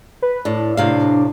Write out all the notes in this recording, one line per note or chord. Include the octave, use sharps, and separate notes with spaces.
B4
A2 D4
A2 C3 F5